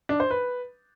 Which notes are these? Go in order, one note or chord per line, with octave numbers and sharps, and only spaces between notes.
D4
C5
B4